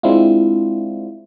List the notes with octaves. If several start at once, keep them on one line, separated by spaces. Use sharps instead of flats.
G#3 C4 D4 E4 F4